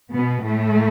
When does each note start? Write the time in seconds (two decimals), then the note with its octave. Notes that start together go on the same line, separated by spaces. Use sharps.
0.12 B2 B3
0.43 A2 A3